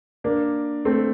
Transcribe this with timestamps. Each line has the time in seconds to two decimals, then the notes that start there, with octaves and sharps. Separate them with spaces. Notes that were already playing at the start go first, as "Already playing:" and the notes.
0.24 A#3 D4
0.85 A3 C4